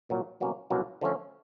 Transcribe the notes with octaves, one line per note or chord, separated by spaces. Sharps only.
C2 A#2 F#3
C2 B2 F#3 A#3 C#4
C2 B2 F#3 A#3 C#4
D3 F3 A3 C#4